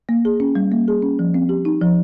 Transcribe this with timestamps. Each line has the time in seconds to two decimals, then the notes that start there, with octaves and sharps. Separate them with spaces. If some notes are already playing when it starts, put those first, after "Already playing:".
0.09 A#3
0.25 G#4
0.40 C#4
0.55 G3
0.72 A#3
0.88 G#4
1.02 C#4
1.19 F3
1.34 C4
1.49 G4
1.65 D#4
1.81 F3